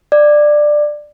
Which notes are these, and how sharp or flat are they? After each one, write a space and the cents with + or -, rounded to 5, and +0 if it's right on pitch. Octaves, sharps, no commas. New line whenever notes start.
D5 +15